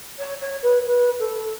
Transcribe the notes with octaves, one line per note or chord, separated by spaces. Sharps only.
C#5
C#5
B4
B4
A4